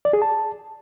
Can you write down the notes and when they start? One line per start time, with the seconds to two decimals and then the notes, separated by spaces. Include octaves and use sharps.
0.05 D5
0.13 G#4
0.22 A5